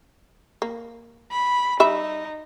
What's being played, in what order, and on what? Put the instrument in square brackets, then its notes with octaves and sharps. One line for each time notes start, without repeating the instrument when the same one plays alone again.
[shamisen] A#3
[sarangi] B5
[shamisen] G3 E5 B5 [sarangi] D#4